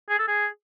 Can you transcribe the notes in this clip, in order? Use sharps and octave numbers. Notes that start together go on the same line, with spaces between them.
G#4
A4
G#4